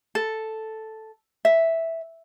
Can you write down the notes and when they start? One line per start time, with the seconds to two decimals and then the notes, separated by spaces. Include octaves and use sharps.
0.15 A4
1.45 E5